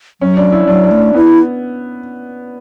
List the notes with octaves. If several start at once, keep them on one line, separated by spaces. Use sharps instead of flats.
F#3 C#4
D4
E4
F#3 D4
D4
A3
D4
B3 E4